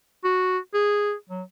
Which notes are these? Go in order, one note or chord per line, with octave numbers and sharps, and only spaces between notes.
F#4
G#4
F#3